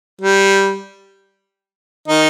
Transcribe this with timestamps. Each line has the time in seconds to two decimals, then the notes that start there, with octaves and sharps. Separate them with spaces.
0.21 G3
2.08 D#3 D#4